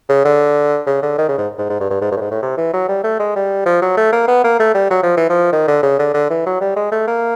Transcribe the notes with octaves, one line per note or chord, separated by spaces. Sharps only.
C#3
D3
C#3
D3
D#3
C#3
G#2
G#2
G#2
G2
G2
G#2
G2
A2
G#2
A2
C3
E3
F#3
G3
A3
G#3
G3
F3
F#3
A3
A#3
B3
A#3
A3
G3
F#3
F3
E3
F3
D#3
D3
C#3
D3
D3
E3
F#3
G3
G#3
A3
A#3